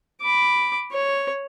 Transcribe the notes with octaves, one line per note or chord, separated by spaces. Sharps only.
B5 D6
C#5